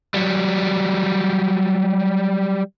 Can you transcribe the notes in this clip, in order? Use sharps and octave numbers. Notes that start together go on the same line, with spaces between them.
F#3 G3